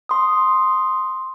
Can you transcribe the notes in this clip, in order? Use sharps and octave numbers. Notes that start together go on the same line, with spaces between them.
C6 D#6